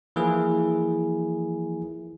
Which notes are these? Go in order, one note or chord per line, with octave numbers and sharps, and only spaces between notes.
E3 F3 A#3 E4 G#4